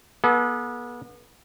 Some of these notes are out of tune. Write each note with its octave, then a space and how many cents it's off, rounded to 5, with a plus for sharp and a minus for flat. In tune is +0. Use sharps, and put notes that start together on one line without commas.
B3 -35 A4 -45